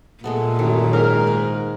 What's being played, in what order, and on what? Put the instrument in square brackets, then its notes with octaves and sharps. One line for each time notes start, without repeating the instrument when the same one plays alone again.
[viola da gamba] A#2 [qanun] G#3 A3 B3
[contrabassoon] A1 [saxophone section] F#2 [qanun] D#3
[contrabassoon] G#2 [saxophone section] A#4 [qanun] F5
[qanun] B4